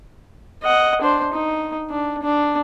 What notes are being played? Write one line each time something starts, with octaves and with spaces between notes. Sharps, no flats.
D#5 F#5
D4 C5
D#4
D4
D4